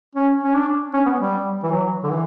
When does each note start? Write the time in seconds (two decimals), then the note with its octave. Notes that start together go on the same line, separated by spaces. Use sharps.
0.15 C#4
0.44 C#4
0.54 D4
0.94 C#4
1.06 B3
1.19 G3
1.63 E3
1.71 F#3
2.03 D3
2.10 E3